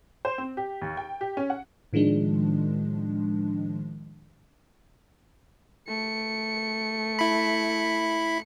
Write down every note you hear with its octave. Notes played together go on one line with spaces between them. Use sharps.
C5
C4
G4
D#2
G5
G4
C#4
F#5
A2 D#3 F3 G#3 D4
A3 C#7
E4 B5